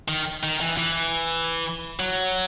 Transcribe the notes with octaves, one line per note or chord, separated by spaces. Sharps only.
D#3
D#3
E3
E3
F#3